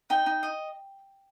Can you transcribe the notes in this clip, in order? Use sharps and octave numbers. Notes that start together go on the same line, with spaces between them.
D#4 G5
D#4
D#5